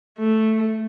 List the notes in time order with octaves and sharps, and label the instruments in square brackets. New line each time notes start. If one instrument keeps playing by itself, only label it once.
[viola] A3